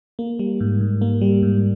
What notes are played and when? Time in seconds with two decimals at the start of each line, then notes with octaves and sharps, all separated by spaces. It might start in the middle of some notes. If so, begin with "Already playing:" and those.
0.19 A#3
0.39 G3
0.61 G#2
0.81 G#2
1.01 A#3
1.21 G3
1.43 G#2